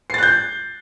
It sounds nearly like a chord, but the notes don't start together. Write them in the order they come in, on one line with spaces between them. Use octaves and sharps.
C7 A6 F#6 G6